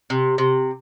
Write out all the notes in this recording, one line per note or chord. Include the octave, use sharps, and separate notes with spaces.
C3
C3